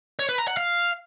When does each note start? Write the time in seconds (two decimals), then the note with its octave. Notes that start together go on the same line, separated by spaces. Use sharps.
0.19 C#5
0.29 B4
0.38 A#5
0.48 F#5
0.57 F5